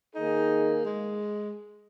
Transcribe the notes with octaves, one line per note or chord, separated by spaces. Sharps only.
D#3 A#3 D#4 G#4
G#3